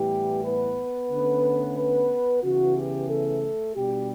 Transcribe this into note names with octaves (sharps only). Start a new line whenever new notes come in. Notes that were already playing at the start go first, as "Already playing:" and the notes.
Already playing: A2 E3 G3 B3 E4 G4
B3 B4
D3 A3 C#4
B3 B4
C#3 E3 B3 F#4
G4
A3 A4
B2 G3 D4 G4